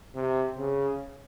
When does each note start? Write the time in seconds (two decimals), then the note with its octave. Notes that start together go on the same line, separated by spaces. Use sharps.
0.16 C3
0.58 C#3